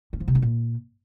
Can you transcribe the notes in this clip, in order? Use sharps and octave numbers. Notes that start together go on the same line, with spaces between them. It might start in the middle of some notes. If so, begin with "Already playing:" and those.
C#4
F3
C3
C#4
A#2